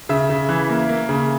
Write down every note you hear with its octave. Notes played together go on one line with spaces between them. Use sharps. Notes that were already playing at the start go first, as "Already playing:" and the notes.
C#3 E5
C#3
E3
A#3
A#3
C#3